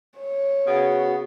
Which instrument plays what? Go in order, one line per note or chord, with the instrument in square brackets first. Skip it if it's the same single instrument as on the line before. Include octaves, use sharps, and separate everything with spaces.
[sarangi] C#5
[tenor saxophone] C#3 [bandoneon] B3 [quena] F#4